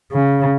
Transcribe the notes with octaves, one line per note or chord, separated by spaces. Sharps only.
C#3